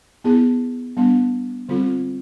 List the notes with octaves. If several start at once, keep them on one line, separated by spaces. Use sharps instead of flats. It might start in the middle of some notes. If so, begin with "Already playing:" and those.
B3 E4 G#4
G3 B3 D4
D3 G3 C4 F4 A4